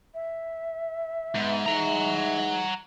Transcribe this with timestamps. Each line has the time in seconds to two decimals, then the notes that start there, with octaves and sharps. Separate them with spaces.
0.14 E5
1.35 G#2 B3
1.66 E3 G#3 D#4 F#5 A#5